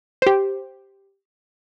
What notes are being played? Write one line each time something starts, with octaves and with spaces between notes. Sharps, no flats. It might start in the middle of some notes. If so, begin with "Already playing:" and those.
G4 C5